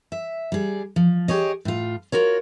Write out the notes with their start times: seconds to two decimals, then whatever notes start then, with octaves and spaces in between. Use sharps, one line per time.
0.12 E5
0.52 G3 G#4
0.96 F3
1.28 G4 G#4 C#5 D#5
1.65 A2 F4
2.12 F4 F#4 A#4 C#5